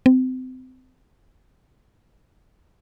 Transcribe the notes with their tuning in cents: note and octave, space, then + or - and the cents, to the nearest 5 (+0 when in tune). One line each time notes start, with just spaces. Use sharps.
C4 -30